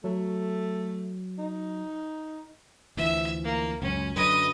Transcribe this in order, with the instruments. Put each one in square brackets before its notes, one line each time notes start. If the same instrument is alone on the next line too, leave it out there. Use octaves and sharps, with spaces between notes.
[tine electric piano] F#3 [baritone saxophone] A3
[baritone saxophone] D#4
[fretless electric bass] D2 E3 F3 [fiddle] E5
[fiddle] A#3
[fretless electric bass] C#2 F#2 [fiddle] C#4
[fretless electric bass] F#2 D3 F#3 [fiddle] B4 D#5